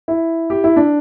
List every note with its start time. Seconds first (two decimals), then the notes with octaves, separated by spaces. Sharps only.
0.08 E4
0.50 G4
0.64 E4
0.76 D4